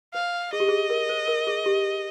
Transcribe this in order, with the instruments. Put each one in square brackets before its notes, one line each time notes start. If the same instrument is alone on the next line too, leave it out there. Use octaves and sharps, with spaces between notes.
[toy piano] C5 [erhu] F5
[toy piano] G#4 [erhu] D#5
[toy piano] G4
G#4
A#4
C5
A#4
G#4
G4